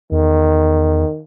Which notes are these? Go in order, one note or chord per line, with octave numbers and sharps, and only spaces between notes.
E2 D#3